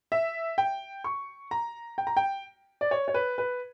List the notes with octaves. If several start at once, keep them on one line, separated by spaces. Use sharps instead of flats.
E5
G5
C#6
A#5
G5
A#5
G5
D5
C#5
C#5
B4
B4